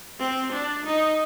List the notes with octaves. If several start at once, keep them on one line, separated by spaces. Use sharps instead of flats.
C4
D4
D#4